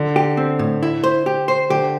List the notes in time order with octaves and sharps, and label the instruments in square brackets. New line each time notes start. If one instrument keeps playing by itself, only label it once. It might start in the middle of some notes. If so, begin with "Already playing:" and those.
Already playing: [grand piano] D3
[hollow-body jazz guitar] G4
C4
A2
E4
C5
G4
C5
[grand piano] D3 [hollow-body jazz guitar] G4